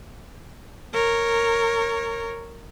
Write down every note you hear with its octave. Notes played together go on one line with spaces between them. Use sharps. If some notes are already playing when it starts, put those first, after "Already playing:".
A#4 C#5